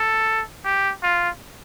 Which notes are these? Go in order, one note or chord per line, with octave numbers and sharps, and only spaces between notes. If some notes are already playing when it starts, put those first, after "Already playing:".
Already playing: A4
G4
F4